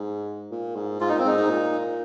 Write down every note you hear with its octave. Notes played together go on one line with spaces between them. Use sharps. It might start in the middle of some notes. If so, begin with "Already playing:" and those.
Already playing: G#2
A#2
G#2
G#2 F4
A#2 D#4
C4
G#2 D#4
G#2
A#2